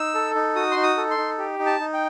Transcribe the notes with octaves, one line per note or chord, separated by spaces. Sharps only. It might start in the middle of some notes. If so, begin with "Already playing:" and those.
Already playing: D#4 E6
A4
D#4
F#4 D#6
D#4 C6
D#6
A4
C6
D#4
G4
D#4
A5
D#4
G5